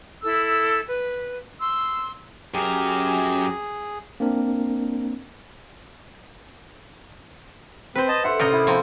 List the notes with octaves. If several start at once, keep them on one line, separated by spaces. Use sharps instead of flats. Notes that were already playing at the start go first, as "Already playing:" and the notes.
E4 A4 E6
B4
C6 E6
F#2 G4 G#4 A#4
A#3 C4 D4 A#4
C4 B4 C5
D#5 A5 G6
D4 A4 E5 F#5 C6
A1 C3 A#4 C5 D#5 D#7
E4 F#5
F3 A#3 C4